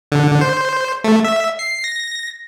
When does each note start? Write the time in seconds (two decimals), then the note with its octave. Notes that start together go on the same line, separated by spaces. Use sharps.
0.12 D3
0.41 C5
1.04 A3
1.25 E5
1.59 C7
1.84 A#6